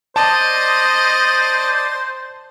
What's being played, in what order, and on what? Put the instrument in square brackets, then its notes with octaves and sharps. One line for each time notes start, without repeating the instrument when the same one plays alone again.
[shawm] C5 [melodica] D5 [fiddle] D#5 [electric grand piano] A5